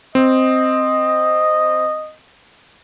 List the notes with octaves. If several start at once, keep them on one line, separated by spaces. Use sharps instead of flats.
C4 D#5